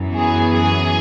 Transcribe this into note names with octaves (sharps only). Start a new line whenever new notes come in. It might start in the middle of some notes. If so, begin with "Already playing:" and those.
Already playing: F#2 E3 B3
G#4
G#4